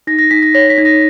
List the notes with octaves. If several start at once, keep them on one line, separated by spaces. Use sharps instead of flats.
D#4 A#6
A#6
D#4 B6
A#6
C#5 A#6
B6
D#4
A#6